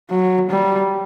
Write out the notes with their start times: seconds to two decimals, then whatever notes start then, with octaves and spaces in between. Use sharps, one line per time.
0.10 F#3
0.50 G3